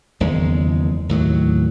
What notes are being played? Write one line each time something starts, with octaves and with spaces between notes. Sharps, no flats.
F#1 E2 D#3 G#3
D#2 A2 F#3